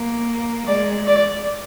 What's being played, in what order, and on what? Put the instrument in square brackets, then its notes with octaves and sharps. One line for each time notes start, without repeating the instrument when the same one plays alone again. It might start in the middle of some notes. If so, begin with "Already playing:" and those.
Already playing: [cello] A#3
[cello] G#3 [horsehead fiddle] D5
[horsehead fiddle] D5